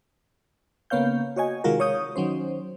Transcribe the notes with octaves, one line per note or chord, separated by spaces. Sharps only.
C#3 A#3 B3 C#5 F5 G6
F#4 C#5 D#5 G#5
C3 D#3 G#3 F4 F#4 A#4
C#5 F5 D#6 G6
D#3 F#3 C#4 C5